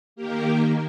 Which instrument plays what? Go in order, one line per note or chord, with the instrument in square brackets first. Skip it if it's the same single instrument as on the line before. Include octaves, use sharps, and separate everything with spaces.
[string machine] D#3 A#3 G4 A#4